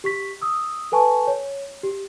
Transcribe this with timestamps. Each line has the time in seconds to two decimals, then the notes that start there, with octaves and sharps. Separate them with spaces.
0.04 G4 C#6 B6
0.42 D#6 E6
0.92 A4 B4 G#5 A5 C#6
1.27 C#5
1.83 G4